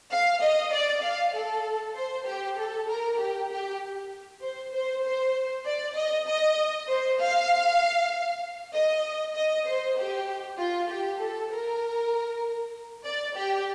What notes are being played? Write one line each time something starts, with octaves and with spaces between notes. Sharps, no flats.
F5
D#5
D5
F5
A4
C5
G4
A4
A#4
G4
G4
C5
C5
C5
D5
D#5
D#5
C5
F5
D#5
D#5
C5
G4
F4
G4
A4
A#4
D5
G4